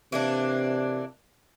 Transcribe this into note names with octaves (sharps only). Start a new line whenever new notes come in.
C3 E3 A#3 D4